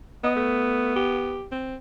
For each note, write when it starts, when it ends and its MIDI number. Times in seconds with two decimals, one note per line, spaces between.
0.24 1.44 59
0.24 0.33 75
0.36 0.95 57
0.96 1.47 67
1.52 1.76 60